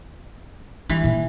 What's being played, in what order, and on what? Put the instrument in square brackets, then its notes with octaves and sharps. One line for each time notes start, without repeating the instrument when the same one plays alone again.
[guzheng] E3 [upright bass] G3
[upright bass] A#2 D#3